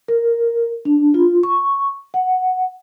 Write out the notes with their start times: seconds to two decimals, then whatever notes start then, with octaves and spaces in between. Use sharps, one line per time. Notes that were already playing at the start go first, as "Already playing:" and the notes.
0.08 A#4
0.85 D4
1.14 F4
1.43 C#6
2.14 F#5